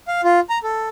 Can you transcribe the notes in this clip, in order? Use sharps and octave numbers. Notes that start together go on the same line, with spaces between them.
F5
F4
A#5
A4